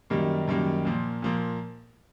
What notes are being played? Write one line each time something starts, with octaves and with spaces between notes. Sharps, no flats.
F#2 D#3 G3 A#3
F#2 D#3 G3 A#3
A#2 F3 A#3
A#2 F3 A#3